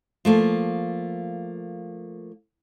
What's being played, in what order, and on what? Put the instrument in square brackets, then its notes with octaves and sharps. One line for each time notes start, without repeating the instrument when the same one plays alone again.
[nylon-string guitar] F3 A3 A#3